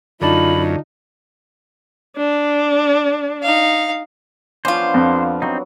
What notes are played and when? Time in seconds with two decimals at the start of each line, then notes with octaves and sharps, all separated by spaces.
0.21 F#2 D3 D#4 F4 D5 A5 B5
2.17 D4
3.42 D#4 F5
4.65 F3 B3 C#4 D4 F4 C5
4.94 F2
5.42 F#3 C4 D#4